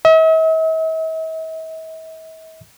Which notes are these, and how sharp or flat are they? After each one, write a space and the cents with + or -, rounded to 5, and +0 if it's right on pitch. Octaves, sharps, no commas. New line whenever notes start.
E5 -45